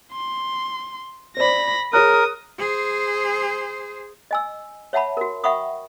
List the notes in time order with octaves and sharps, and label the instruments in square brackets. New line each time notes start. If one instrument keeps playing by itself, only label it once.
[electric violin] C6
[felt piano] C5 D5 [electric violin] B5 A#6
[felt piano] G#4 C#5 F#6 [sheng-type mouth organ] A#4 [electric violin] D#6
[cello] G#4 C5
[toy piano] D#5 G#5 E6
C#5 E5 F#5 A5 B5
F#4 A#4
E5 F#5 G5 B5 C#6 D#6